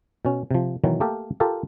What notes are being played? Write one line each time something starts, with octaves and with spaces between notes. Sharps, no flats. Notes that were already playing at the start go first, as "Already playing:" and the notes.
B2 C#4
C3 F3
B2 D#3 E3 F#3
A3 A#3 G4 A4 A#4
F4 G4 A4 A#4